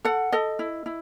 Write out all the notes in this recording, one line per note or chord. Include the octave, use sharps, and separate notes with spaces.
A4 F#5
A4 D#5
E4
E4